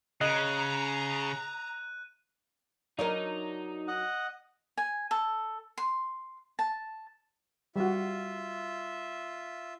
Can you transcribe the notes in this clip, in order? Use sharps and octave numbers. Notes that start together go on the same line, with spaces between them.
C#3 D#5 A#5 F#6 D#7
F#3 D4 D#4 A#4 D5
D#5 F#5
G#5
A4
C6
A5
G3 F4 F#4 E5